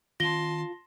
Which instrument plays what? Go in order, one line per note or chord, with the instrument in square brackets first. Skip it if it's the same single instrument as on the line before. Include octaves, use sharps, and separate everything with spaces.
[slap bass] D#3 C4 [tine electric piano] F4 [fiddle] A5 C6 [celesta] A#6 G7